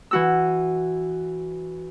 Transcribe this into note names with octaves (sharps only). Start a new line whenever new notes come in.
E3 F#4 E6